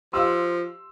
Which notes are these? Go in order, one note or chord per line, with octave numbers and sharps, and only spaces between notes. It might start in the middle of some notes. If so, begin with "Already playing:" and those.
F3 G4 D#5 F5 C6 E6